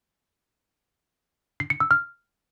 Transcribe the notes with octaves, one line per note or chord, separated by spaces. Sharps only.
C7
C#7
E6
F6